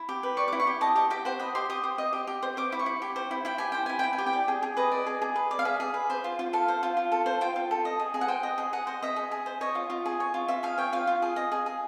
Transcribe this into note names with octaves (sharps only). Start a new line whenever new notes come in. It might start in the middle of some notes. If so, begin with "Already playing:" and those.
Already playing: E4
G4
B4
D5 C#6
E4 D6
C#6
G4
D#5 A5
G4 A5
G4 G5
C5 F#5
D#5 B5
G4 C6
G4 D#6
C5
D#5
G4
G4
C5
C5 D6
E4 D6
C#6
E4
G4
C5
E4
E4 G5
G4 G#5
C5 G5
E4 G#5
E4 G5
G#5
G4
G5
D5
G#4
G#4
B4 D#5
D5
G#4
G#4
B4
D5
F5
G#4 E5
G#4
B4
C5
F4
F4
A4 F5
C5
F4
F4
A4
C5
F4 G5
F4
A4
D#5
G#4
G#4
F#5
C5 G5
D#5
G#4
G#4 F#5
C5 D#5
D#5 E5
G#4
G#4
C5
C#5 D#5
F4
F4
G#4
C#5
F4
F4 E5
G#4 F5
C#5 G5
F4 F5
F4
G#4
D#5
G#4
G#4